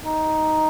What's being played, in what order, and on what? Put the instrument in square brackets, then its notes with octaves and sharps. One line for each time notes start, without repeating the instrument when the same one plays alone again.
[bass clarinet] D#4